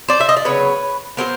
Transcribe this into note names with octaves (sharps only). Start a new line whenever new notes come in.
C5 D5
E5
D#5
D5
C#3 F#3 B3 B4 C#5
F#3 B3 A#4 C5